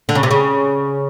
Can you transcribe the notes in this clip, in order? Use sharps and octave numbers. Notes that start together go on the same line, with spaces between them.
D3
C#3
C3
C#3